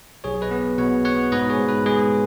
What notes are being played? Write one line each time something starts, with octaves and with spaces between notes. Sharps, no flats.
B1 G#4 C#5
B4 D#5
B3
B2 C#5 F#5
B3 C#5 F#5
G#2 B4 D#5
G#4 C#5
G#2
B4
G#3 G#4